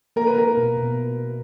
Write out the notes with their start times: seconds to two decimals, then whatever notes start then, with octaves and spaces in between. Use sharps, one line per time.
0.16 A#3 A#4
0.27 B4
0.37 A#3 A#4
0.57 B2
0.77 B2